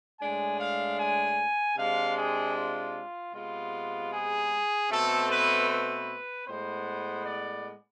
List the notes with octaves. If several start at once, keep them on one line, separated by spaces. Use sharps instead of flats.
A2 G#3 D4 G#5
F5
G#5
C3 G#3 D4 F5
G#4
F4
C3 G#3 B3 F4
G#4
B2 A3 C4 A4
B4
B4
A2 G#3 B3 C5
D5